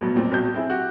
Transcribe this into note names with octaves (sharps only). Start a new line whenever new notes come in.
D2 B2 F#3
E1 A#2 C4
B1 F#3 G6
C4 E4 G#4
F#4 G4